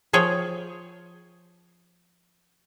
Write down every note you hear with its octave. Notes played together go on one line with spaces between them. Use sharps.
F3 G#4 C#5 G5